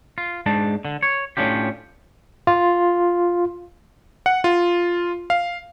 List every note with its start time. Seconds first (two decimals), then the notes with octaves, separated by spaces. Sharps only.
0.18 F4
0.46 G#2 G#3 D4 A5
0.85 D3
1.03 C#5
1.37 A2 C#4 D4 F4 G4
2.47 F4
4.26 F#5
4.44 F4
5.30 F5